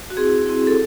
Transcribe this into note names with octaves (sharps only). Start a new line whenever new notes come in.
F#4
C4 E4 G#4
C4 E4
A4